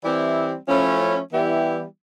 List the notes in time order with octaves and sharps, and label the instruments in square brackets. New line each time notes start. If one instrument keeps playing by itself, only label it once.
[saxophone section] E3 G3 C4 E4 G4
F3 A3 C#4 E4
E3 G3 B3 E4 G4